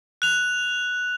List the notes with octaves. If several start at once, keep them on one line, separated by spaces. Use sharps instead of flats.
F#6 F7